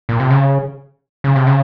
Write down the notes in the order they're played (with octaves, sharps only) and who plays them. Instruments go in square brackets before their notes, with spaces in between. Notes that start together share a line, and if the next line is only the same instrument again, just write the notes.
[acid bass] A#2
C3
C#3
C#3
C3
C#3